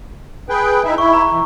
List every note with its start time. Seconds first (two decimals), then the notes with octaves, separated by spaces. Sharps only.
0.49 G#4 B4 G5
0.85 D#4 E4 E5
0.98 E4 C#6
1.13 A#5
1.32 E3